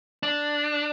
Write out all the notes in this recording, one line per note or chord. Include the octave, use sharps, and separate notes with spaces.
D4